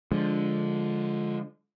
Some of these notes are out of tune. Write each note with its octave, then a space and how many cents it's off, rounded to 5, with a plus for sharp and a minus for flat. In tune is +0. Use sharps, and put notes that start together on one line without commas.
D3 -10 F3 +5 G#3 +0